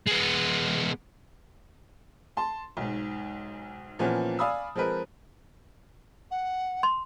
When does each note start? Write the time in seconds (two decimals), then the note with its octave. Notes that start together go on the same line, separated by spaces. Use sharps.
0.07 G#3 B3
2.37 A5 C6
2.77 B1 G#2
3.99 A#2 E3 F3 A#3 B3 C#4
4.39 D5 F5 G#5 B5 D#6 E6
4.75 F3 G#3 C4 A#4 B4
6.31 F#5
6.83 C6